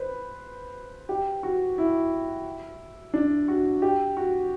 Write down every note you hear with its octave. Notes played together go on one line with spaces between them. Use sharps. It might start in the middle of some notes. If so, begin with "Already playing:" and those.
Already playing: B4 C5
G4
F#4
E4
D4
F#4
G4
F#4